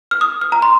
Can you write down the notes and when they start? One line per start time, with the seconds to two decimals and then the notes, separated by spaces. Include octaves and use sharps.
0.11 F6
0.21 D#6
0.41 F6
0.52 A#5
0.62 C6